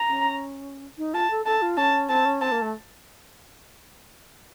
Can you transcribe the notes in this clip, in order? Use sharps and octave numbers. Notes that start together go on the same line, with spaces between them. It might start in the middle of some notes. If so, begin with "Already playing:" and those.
Already playing: A#5
C#4
D#4
F4 A5
A4
A4 A5
F4
C#4 A5
C4 A5
C#4
C4 A5
A#3
A3